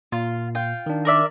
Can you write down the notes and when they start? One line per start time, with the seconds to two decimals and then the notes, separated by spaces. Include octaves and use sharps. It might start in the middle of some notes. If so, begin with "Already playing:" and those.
0.12 A#2 F4
0.55 F4 G5
0.86 D#3 D4
1.05 A#4 D5 E5